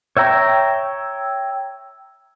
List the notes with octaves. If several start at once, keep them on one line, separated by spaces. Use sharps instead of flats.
C#5 E5 G5 A#5